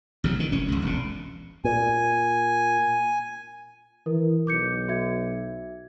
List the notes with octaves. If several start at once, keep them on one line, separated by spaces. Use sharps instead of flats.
A1 C3 F#3
D#3
F1 C#4
F1 C#2
E1 A#2
A#2 G#5
E3 A#4
B1 D6 G6 C#7
F#4 E5 G#6